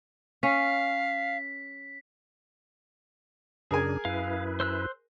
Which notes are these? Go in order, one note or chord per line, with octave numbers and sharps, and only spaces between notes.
C#4 F5 B6
F#2 C#3 D4 G#4 A#4 G#5
F#2 E4 B4 F5
C5 E6 F#6